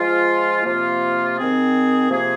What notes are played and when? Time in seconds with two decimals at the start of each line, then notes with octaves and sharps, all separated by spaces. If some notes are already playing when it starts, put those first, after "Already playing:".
Already playing: F3 G#3 F4
0.64 C3 F3 A#3 F4
1.36 D#3 C4 G#4
2.09 C3 F3 A#3 G#4